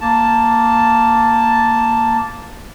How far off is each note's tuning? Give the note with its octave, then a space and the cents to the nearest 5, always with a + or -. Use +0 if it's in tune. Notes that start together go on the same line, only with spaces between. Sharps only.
A#3 +0 A5 +0